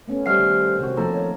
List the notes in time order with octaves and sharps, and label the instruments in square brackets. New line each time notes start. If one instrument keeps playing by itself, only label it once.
[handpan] A3 B3 C#4
[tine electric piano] G3 E5 F#5 [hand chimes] G4 F6 C7 [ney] C5
[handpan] D#3
[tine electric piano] C3 F#4 [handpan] C4
[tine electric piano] F3 D#4 A4 [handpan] A3 A#3 [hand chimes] A#5
[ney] C#5